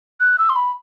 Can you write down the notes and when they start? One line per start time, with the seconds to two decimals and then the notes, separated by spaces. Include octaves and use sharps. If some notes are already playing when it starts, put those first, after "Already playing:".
0.20 F#6
0.38 E6
0.49 C6
0.56 B5